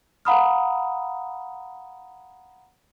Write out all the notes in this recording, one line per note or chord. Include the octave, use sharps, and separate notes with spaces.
F5 F#5 A#5 B5 D#6 F6